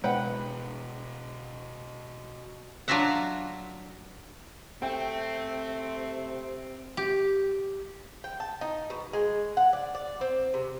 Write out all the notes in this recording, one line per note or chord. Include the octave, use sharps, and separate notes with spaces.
B2 G#3 B4 F#5 G5
F#3 D4 F4 F#4 E5 F#5
C3 A3 C4 G5
G4
G5
A5
D#4
B2
G#3
F#5
D5
D5
C4
C3